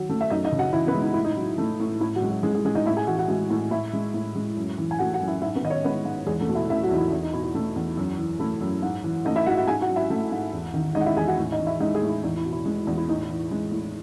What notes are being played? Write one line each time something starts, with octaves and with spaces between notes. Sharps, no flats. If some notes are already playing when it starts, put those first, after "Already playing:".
Already playing: D#3 F#3 F#4
A3
E5
F#2 D#4 D#5
D#4 D#5
C#3
F#4 F#5
E3 E4 E5
B3 B4
G#3
D#4
A2 E4
D#4
F#3
A3
A2
A2 E4
F#3 F#4
G#3
F#3 F#4
A2 G#3 G#4
G#3 G#4
G#3 G#4
D#4 D#5
A2 E4 E5
G#4 G#5
E3 F#4 F#5
F#4 F#5
G#3 F#4 F#5
A2
A2 E4 E5
G#3
A2
G#3
F#2
E3
G#5
A3 F#4 F#5
F#4 F#5
F#2
E4 E5
G#2 E4 E5
B3 B4
D#3 D#5
C#4 C#5
G#3 B3 B4
G#2
E2 G#3 G#4
A3 A4
B2
E4 E5
A3 E4 E5
F#3 F#4
E2 D#4
E4
E2
D#4
B2 E4
E4
A3
E2
F#2
E3
A3 E4
F#2
G#2
E3
A3 D#4 D#5
E4 E5
G#2 F#4 F#5
F#4 F#5
G#2 G#4 G#5
F#4 F#5
F#3
E4 E5
A3
G#2
E2
D#3
G#3 D#4 D#5
F#5
E4 E5
E2 G#4 G#5
F#4 F#5
A2
D#4 D#5
E3
E4 E5
G#3 D#4 D#5
G#3 G#4
A2
E4
E2 D#4
E4
B2
E4
G#3
E2
E4
A2 D#4
E4
E3
G#3
A2